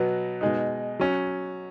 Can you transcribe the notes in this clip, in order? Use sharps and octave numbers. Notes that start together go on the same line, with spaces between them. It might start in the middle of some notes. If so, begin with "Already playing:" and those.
Already playing: B2 F#3 B3
B2 G#3 D#4
F#3 C#4